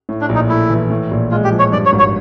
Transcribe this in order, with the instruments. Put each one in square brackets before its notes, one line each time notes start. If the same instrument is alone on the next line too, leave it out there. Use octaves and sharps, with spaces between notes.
[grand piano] A2
[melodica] D4
[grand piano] A#1
[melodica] D#4
[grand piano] A3 [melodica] E4
[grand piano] E3
A2
A#1
[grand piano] G#3 [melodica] F4
[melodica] G4
[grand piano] F3
[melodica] C#5
[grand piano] G2 [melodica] D5
[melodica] C#5
[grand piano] G#1
[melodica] C#5